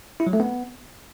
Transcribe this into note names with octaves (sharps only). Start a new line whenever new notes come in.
E4
F#3
A3
B3